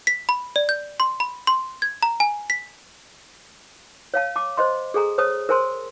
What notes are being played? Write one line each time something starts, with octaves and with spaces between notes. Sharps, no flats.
B6
B5
D5
G6
C6
B5
C6
G#6
A#5
G#5
B6
C#5 F5 A5
A5 D6
C5 D#5 C6
G#4 A4 G#5 A#5
C5 C#5 A5 D#6
A#4 C5 G#5 A5 C6